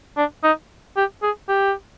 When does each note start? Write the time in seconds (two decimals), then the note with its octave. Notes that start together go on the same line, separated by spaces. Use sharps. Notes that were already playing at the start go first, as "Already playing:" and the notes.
0.17 D4
0.44 D#4
0.96 G4
1.22 G#4
1.48 G4